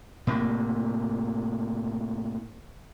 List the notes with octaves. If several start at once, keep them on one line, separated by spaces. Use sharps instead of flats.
A2 C3 A#3